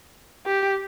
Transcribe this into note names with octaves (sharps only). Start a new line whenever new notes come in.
G4